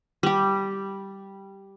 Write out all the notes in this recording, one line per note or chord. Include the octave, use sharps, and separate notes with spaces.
G3 G4